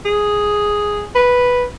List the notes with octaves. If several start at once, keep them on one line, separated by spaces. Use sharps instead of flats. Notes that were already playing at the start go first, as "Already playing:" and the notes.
G#4
B4